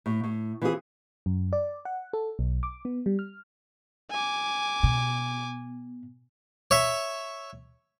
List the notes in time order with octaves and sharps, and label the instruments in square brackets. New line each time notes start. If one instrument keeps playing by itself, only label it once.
[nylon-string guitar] A2
A2
E3 C4 F4 F#4 G#4
[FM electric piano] F#2
D5
F#5
A4
B1
D6
B3
G3
F6
[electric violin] G#5 D6
[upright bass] B2
[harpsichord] C#5 E5